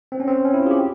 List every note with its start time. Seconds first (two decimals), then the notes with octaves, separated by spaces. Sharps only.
0.12 C4
0.20 C#4
0.27 C4
0.45 C#4
0.54 E4
0.62 F4
0.66 G#4
0.71 G4